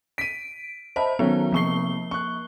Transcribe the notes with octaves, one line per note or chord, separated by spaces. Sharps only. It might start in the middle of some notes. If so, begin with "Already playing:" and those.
B6 D7 D#7
C5 D#5 E5 A5 B5
D#3 F#3 B3 C#4
C2 F3 A#3 C#6 C7 G7
C#6 F#6